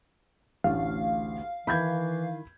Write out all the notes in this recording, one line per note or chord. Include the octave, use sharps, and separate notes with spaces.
A1 D2 A3 D4 F5
D#3 E3 D#4 E4 B5 G6 G#6